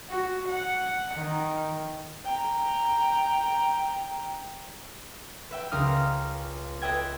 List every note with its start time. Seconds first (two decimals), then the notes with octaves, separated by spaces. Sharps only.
0.10 F#4
0.49 F#5
1.16 D#3
2.24 G5 A#5
5.51 B4 E5 G5
5.71 C#2 A#4 F5 D#6 F6
6.82 A4 B4 D#5 E5 G5 G#6